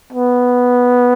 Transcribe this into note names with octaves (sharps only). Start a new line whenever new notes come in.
B3